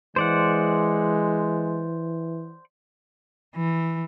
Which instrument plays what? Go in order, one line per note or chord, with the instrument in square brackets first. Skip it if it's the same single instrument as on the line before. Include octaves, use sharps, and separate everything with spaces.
[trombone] E3 [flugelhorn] G#3 [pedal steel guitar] C5 D5 F#5
[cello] E3